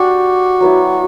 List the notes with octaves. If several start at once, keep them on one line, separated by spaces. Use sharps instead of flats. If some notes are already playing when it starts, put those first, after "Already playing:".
Already playing: D4 F#4 G4 D5
F#3 B3 E4